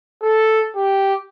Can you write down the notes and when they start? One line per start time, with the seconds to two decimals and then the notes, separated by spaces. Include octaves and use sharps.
0.22 A4
0.76 G4